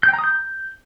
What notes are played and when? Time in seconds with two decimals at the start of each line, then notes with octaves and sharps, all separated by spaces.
0.03 G6
0.08 G5
0.13 A#5
0.19 D#6
0.24 G6